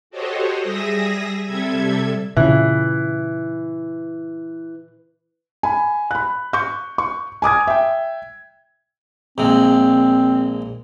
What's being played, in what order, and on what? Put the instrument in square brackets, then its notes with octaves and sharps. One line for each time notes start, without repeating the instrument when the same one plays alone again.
[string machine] F#4 G4 A4 C5 C#5 D#5
G3 G#4 E5 D#6 A#6
C3 G3 A4 E5 G#6
[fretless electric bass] A#2 C#3 [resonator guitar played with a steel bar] E3
[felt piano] G#5 B5
B5 F#6
C#6 G6
C#6
G#5 D6 D#6 G#6
E5 G5
[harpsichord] A#1 A#2 G#3 [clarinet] C4